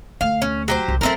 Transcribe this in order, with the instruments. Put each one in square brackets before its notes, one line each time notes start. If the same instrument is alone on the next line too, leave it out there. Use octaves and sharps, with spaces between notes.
[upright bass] D2 [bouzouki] F5
[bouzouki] C#4
F#3 G4 C5
[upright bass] C2
[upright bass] F#3 B3 [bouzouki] A3 C4 A#4